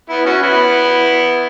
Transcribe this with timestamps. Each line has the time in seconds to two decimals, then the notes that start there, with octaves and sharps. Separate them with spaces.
0.09 B3 E4
0.25 C#4 F#4
0.43 B3 E4